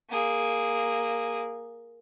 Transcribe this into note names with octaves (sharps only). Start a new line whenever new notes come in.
A#3 G#4